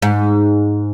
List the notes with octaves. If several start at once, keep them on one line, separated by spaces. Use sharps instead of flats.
G#2